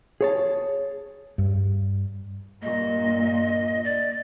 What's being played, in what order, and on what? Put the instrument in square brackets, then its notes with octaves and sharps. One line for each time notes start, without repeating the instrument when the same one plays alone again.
[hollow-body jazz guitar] G#4 C#5 A5
[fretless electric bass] G2
[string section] G2 A#2 [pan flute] D#5
[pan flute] D5